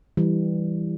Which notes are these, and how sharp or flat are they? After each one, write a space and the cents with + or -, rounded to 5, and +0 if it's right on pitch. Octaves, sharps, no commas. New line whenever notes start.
E3 +0 G3 +0